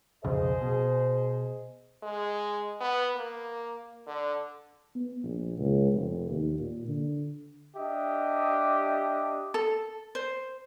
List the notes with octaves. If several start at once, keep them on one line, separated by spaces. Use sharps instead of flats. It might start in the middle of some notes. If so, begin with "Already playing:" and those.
B1 F2 C#3 G#4 C5 D#5
B2
G#3
B3
A#3
D3
B3
A#1
C#2
F1
D#2
A#2
D3
D4 G4 D#5 E5
A4
C5